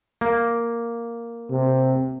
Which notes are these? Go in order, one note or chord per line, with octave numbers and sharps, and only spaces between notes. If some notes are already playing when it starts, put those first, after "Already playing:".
A#3
C3